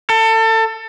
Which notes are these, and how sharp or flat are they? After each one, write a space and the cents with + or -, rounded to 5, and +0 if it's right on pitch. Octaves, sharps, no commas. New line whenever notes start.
A4 +25